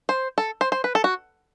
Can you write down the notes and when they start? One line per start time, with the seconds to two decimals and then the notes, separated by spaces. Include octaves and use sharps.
0.09 C5
0.38 A4
0.61 C5
0.72 C5
0.84 B4
0.95 A4
1.04 F#4